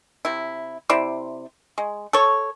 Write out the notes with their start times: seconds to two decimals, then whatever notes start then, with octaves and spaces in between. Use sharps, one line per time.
0.25 C3 E4
0.89 C3 E4 C5 D5
1.78 G#3
2.13 A4 C#5